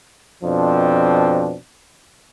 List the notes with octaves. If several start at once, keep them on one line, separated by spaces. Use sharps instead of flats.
F2 B2 F3 C4 D4